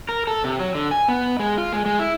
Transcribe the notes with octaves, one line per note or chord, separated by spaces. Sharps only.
A#4
A4
C3
F#3
D3
G#5
B3
G#3
F4
G#3
G#3
E4